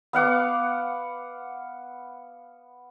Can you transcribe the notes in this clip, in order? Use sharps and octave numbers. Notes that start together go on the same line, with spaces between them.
B3 F5 F#5 D6